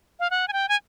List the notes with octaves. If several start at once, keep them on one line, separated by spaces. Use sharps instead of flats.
F5
F#5
G#5
G5
G#5